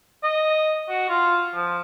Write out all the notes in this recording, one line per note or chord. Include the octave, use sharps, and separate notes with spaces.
D#5
F#4
F4
F3